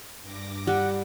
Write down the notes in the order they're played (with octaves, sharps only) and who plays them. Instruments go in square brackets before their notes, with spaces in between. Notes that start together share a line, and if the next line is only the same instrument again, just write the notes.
[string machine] G2 D6 A#6
[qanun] G3 [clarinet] F#5